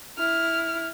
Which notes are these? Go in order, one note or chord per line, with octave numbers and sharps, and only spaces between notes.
E4 F6